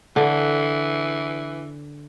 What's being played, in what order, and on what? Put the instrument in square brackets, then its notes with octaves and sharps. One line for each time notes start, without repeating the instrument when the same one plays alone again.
[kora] D3 [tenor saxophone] E3